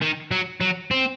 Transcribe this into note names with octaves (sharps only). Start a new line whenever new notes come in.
D#3
F#3
F#3
C4